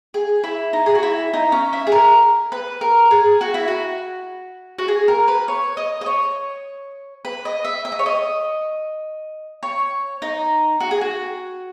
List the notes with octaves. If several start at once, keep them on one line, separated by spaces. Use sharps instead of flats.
G#4
E4
D#4
G#4
F#4
E4
D#4
C#4
E4
G#4
A#4
B4
A#4
G#4
F#4
E4
F#4
F#4
G#4
A#4
B4
C#5
D#5
D#5
C#5
B4
D#5
E5
E5
D#5
C#5
D#5
C#5
D#4
F#4
G#4
F#4